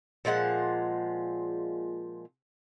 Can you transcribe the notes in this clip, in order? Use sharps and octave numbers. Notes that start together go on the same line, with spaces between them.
A#2 F3 G#3 F#5